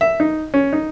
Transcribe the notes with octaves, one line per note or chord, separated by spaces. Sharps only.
E5
D#4
C#4
D#4